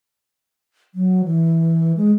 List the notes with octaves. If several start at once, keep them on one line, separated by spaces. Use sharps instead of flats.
F#3
E3
G#3